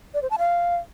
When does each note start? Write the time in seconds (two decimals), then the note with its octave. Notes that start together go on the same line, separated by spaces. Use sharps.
0.14 D5
0.22 C5
0.31 A5
0.39 F5